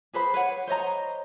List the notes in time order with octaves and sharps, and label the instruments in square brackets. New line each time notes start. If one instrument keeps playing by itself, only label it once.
[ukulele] G#4 B4 C5 B5
B4 C#5 F#5
C5 C#5 D#5 A#5